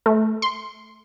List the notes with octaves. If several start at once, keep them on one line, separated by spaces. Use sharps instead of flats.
A3
C6